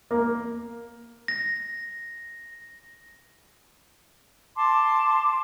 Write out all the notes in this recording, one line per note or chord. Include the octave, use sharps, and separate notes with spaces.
A#3
A#6
A5 C6 D6